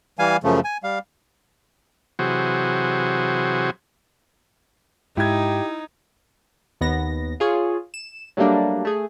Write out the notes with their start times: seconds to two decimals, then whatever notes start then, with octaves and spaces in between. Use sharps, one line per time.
0.19 E3 G3 F5 G#5
0.44 F#2 C#3 F3 A3
0.64 G#5
0.83 G3 F5
2.19 C3 E3 F#3 F#4 G#4 C5
5.17 G#2 D#4 E4 G4 G#6
6.81 D#2 B3 A#6
7.40 F4 G#4 C#5
7.94 E7
8.37 F#3 G3 A3 A#3 D4
8.85 A3 G#4